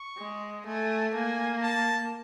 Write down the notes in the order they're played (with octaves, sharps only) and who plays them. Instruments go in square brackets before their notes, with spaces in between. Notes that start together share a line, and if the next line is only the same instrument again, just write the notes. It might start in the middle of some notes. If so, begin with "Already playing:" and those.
Already playing: [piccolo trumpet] C#6
[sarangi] G#3
[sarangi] A3 [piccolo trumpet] G#5
[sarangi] A#3 [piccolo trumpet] G#5
[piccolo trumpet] A5